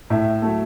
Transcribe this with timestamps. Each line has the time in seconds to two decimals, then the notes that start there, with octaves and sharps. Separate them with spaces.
0.10 A2 E5
0.42 F#3 A3